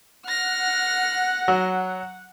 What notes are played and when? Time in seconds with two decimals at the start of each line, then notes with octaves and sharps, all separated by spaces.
0.27 F#5 F6 A#6
1.48 F#3